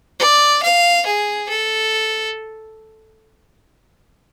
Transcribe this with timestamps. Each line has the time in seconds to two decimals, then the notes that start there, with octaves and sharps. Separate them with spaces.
0.20 D5
0.63 F5
1.06 G#4
1.49 A4